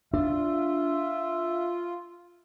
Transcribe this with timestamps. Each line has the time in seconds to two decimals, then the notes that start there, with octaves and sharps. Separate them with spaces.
0.14 D4 F4 E5